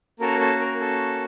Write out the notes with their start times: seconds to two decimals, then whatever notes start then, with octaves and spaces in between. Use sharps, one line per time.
0.20 A#3 C#4 F#4 A4 A#4
0.40 A4
0.60 A#4
0.81 A4